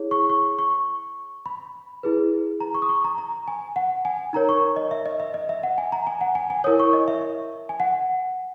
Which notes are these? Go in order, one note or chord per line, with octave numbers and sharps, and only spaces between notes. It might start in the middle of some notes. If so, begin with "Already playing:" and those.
Already playing: E4 G#4 C#5
C#6
C#6
C#6
B5
E4 G#4 B4
A#5
C#6
D#6
C#6
A#5
A#5
G#5
F#5
G#5
D#4 A#4 C#5 A#5
C#6
D#5
E5
D#5
E5
D#5
E5
F#5
G#5
A#5
G#5
F#5
G#5
G#5
E4 A#4 C#5 D#6
C#6
D#5
E5
G#5
F#5